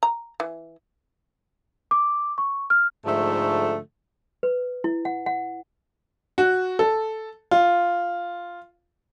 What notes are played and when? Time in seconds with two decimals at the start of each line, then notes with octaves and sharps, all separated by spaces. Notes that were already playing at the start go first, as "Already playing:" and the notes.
0.03 A#5
0.40 E3
1.91 D6
2.38 C#6
2.70 F6
3.06 G#2 D3 F3 A3
4.43 B4
4.84 E4
5.05 F#5
5.26 F#5
6.38 F#4
6.79 A4
7.51 F4